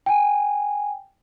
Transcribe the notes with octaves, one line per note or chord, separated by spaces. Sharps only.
G5 G#5